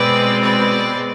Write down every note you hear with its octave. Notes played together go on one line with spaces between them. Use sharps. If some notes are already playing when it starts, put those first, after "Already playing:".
Already playing: B2 G#3 C4 B4 D5
B4 D5